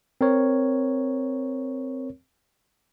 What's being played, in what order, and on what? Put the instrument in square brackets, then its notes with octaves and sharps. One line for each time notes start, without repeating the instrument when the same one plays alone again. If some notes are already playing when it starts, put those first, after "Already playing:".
[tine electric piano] C4 A#4 C#5